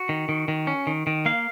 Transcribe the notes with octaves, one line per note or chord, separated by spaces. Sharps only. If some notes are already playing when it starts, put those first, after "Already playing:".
Already playing: F#4
D#3
D#3
D#3
C#4
D#3
D#3
A#3 F5